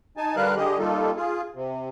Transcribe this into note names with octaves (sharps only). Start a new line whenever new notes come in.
D#4 G#5 A5
D3 G3 A#4 B4 F5 F#6
D3 G4 G#4 D#5
G3 A#3 D#4 F4 A4
F4 G#4
C3